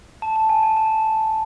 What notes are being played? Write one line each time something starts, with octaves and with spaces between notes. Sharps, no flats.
A5
A5
G#5
G#5
A5